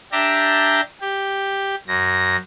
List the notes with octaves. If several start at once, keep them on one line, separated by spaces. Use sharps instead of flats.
D4 G4 E5 G5 A5 A#5
G4
F#2 A#6